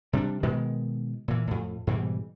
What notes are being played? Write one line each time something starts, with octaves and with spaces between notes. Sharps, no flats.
C3 G3 C#4 D4
B2 D#3 G#3 B3
A#2 E3
F2 A2
G#2 B2 E3 G3